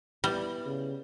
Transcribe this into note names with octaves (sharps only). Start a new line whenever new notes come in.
G3 B3 E4
C#3